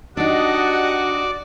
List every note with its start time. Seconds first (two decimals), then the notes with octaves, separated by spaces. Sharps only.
0.17 D4 D#4 F#4 G4 D5 D#5 F#5